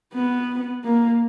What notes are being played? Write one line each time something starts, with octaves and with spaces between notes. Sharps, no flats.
B3
A#3